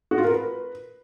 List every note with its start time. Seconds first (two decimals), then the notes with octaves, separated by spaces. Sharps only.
0.11 F#4
0.18 F4
0.24 A#4
0.31 B4